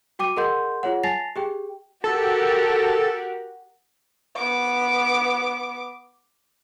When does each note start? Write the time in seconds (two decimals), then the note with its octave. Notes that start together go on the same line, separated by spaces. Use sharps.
0.19 F#4 G5 D6 D#7
0.36 G#4 A#4 D#5 F#5 C6 G6
0.83 F4 G#4 C#5 F#5
1.03 G#5 A5 A6 A#6 C7 F7
1.36 G4 G#4 G5
2.04 F#4 G4 A4 A#4
4.36 B3 D6